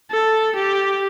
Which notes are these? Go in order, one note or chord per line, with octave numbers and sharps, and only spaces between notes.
A4
G4